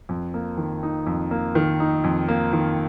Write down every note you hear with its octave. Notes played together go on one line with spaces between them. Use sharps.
F2
A#3
D#3
D#4
F2
A#3
D#3
D#4
F2
A#3
D#3